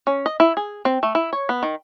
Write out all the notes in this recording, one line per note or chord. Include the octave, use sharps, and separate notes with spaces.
C#4
D#5
E4
G#4
C4
A3
E4
C#5
B3
D#3